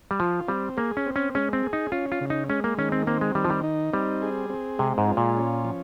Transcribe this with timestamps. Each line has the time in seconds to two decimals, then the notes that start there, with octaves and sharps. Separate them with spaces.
0.11 G3
0.20 F3 F4
0.48 G3 C4
0.77 A#3 G#4
0.97 C#4
1.06 C4
1.16 C#4
1.35 G#3 C#4
1.53 C4
1.63 G#4
1.73 D#4
1.92 C#4 F4
2.12 F4
2.21 C#3
2.30 D#4
2.49 G#3 C#4
2.64 A#3
2.77 D#3 C#4
2.92 C4
3.07 A#3 C4
3.21 G#3
3.35 D#3 G3
3.45 F3
3.50 G3
3.64 D#4
3.93 G3 C4
4.22 G#4
4.50 C4
4.78 C3 G#3
4.98 G#2
5.08 F4
5.17 A#2
5.37 C#4
5.65 F3